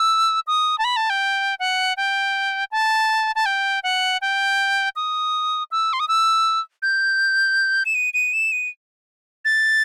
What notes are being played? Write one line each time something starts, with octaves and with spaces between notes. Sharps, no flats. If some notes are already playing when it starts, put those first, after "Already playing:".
Already playing: E6
D#6
A5
B5
A5
G5
F#5
G5
A5
A5
G5
F#5
G5
D#6
E6
C6
D#6
E6
G6
E7
D#7
D#7
E7
D#7
A6